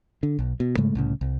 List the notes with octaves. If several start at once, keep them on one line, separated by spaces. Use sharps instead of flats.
D3
B1
B2
G#2 C#3 G#3 A3
C2 A2 C#3
C2